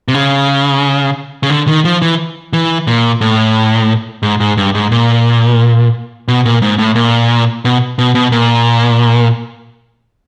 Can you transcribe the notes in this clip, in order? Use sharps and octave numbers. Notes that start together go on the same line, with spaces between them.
C3
C#3
C#3
D3
D#3
F3
E3
E3
A#2
A2
G#2
G#2
G2
G#2
A#2
B2
A#2
G#2
A2
A#2
B2
B2
B2
A#2